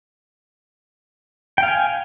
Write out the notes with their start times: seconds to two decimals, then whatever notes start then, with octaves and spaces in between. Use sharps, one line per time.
1.58 G5
1.63 F5
1.68 G#5